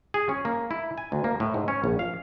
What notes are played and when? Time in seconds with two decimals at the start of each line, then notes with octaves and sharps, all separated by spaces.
0.14 G#4
0.29 C#4
0.45 A#3
0.71 E4
0.98 G#5
1.12 D2
1.24 A#3
1.40 A2
1.54 G#2
1.68 C#4
1.84 A#1
1.99 F5